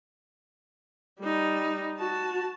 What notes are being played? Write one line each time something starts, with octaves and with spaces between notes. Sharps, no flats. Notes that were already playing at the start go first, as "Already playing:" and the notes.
G3 D#4
F#4 A5